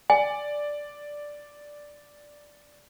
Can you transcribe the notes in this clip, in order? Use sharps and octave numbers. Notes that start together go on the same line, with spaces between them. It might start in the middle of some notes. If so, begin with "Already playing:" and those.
D5 G#5